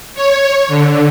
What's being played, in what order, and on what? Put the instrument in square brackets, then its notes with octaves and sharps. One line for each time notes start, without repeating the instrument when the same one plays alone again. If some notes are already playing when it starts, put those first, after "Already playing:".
[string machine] C#5
D3